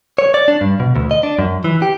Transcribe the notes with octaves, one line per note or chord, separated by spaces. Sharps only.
C#5
D5
D4
G2
B2
D2
D#5
D4
F#2
E3
G4